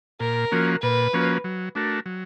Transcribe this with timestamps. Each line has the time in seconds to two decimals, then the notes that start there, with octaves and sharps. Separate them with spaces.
0.20 A#2 A#4
0.52 F3 A#3 C#4 F#4
0.82 A#2 B4
1.13 F3 A#3 C#4 F#4
1.44 F#3
1.75 A3 D4 F#4 A#4
2.06 F#3